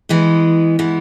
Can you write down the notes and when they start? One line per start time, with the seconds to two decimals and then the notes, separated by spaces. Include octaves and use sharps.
0.09 E3 G#3 B3
0.79 E3 G#3 B3